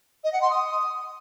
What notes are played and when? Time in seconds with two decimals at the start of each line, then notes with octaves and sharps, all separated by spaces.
0.24 D#5
0.32 F#5
0.41 C6
0.50 D#6